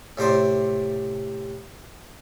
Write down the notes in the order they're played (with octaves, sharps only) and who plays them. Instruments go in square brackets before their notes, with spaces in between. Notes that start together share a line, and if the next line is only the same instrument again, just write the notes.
[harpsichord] A2 C3 C5 D5 C6